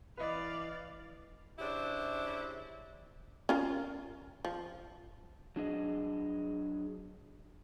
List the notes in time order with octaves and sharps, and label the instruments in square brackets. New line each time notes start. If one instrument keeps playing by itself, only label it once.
[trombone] E3 [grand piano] B4 D#5 [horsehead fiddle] D5 F5
[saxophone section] C#3 D4 E4 G4 C5
[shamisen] C#4 F4 A#4
F3
[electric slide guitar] F#3 D4 G#4 D#5